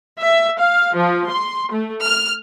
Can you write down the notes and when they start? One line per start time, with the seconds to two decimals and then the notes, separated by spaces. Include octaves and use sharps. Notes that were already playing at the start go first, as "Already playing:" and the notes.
0.19 E5
0.57 F5
0.94 F3
1.27 C6
1.72 A3
2.04 F6